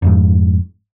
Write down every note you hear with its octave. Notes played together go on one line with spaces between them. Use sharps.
F1 F2 G#2